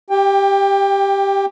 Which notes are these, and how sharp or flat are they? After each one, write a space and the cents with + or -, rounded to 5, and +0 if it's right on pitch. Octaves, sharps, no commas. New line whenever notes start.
G4 +0 G5 +25